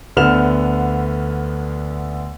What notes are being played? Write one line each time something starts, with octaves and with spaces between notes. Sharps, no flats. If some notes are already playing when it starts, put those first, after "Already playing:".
D2 D3 B3 F6 E7 F7